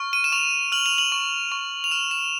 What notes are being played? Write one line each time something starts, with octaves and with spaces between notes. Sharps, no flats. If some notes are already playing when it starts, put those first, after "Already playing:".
Already playing: C#6 F6
D#7
E7
C#6 F7
F6 F#7
F7
F#7
C#6
C#6
F7
F6 E7
E7